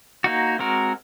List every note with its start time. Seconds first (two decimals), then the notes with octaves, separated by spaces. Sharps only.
0.24 A#3 D#4 F#4
0.59 G#3 C4 F#4 A#4